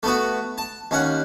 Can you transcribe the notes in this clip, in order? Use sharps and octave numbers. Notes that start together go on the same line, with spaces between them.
A3 B3 F#4
A5
D#2 C#4 F#5